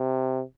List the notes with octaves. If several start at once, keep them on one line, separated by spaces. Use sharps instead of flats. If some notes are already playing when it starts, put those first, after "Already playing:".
Already playing: C3